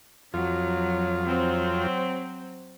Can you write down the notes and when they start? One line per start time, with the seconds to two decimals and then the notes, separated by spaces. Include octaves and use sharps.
0.34 F2 F#3 F4
1.23 F#3 C4